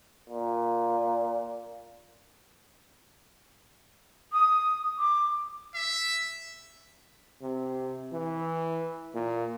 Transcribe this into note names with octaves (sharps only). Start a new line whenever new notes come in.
A#2
D#6
D6
E5
C3
E3
A#2